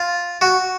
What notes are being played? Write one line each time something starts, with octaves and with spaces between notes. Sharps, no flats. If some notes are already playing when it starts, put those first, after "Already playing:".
Already playing: F4
F#4